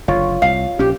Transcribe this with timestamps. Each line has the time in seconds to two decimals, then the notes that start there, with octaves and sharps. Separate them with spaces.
0.08 F#1 D3 F4 C#5
0.42 C2 F5
0.79 A#1 C#4 G4